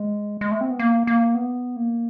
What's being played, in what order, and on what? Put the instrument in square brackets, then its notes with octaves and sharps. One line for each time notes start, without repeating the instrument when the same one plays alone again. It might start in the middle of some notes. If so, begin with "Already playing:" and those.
Already playing: [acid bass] G#3
G#3
A3
C4
B3
A#3
A#3
B3
A#3